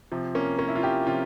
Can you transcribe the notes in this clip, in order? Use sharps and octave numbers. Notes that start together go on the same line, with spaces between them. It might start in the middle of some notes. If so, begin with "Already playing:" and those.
C3 F3
A#3 C#4
A#3 C#4
E4
F4
E4 G4
C3 F3 C#4 F4